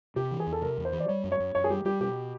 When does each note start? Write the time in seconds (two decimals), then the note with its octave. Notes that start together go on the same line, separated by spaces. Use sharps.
0.16 C3 G4
0.31 E3
0.40 G#4
0.47 E2
0.53 A4
0.62 C3 A#4
0.78 E2
0.85 C5
0.92 E3
1.00 D5
1.08 G3 C#5
1.24 F#2
1.32 C#5
1.40 F#2
1.55 F#2 C#5
1.64 G#4
1.70 G3 G4
1.85 G3 G4
2.00 B2 G4